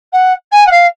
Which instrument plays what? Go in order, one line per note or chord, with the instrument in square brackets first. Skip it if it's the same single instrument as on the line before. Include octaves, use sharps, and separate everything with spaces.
[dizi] F#5
G#5
F#5
F5